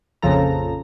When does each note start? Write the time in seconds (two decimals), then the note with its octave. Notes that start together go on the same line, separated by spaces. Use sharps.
0.22 A#1 F2 C#3 F3 A4 A#5